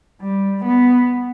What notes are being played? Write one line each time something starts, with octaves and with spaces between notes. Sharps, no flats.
G3
B3